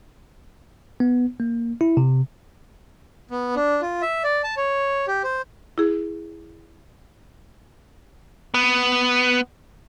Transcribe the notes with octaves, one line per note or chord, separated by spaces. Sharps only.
B3
A#3
E4
C3
B3
D4
F4
E5
D5
A5
C#5
G4
C5
E4 G#4
B3